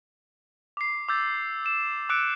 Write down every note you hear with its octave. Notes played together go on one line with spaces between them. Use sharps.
D6 C7
D6 E6 G6 A6
E7
D6 E6 F#6 C#7 D7